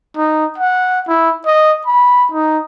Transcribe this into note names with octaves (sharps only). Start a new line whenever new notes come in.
D#4
F#5
E4
D#5
B5
D#4